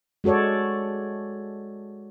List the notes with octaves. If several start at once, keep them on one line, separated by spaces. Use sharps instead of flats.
G#3 F#4 A4 C#5 D5